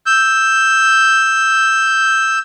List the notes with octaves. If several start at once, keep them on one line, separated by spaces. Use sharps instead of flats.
E6 G6